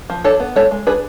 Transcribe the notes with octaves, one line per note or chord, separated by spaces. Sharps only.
F3
D4 A4 C#5
B3
G#3 A4 C#5
G#3
D4 G#4 B4